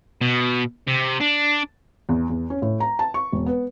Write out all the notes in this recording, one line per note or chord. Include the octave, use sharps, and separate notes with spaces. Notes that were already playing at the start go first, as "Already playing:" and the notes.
B2
C3
D4
E2
E2
C#4
A2
A#5
A5
C#6
E1
B3